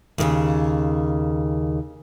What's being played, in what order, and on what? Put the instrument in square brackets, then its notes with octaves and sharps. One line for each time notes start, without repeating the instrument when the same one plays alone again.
[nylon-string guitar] D#2 A2 C#3